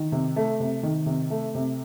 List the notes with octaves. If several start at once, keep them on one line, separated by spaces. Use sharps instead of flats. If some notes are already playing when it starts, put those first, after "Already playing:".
Already playing: D#3
C3
A3
C3
D#3
C3
A3
C3